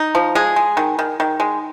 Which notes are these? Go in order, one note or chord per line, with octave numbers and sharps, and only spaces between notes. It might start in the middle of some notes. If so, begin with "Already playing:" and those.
Already playing: D#4
F3
G#3 G#4
G#3
D#3
D#3
D#3
G#3